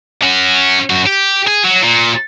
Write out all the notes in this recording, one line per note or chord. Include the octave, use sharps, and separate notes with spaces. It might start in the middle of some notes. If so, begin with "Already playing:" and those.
C#4 F#4
F#2 F#4
G4
G#4
F#3
A#2